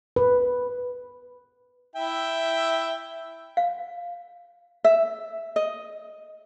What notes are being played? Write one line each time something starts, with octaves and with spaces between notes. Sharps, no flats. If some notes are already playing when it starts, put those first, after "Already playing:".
B4
E4 E5 G5
F5
E5
D#5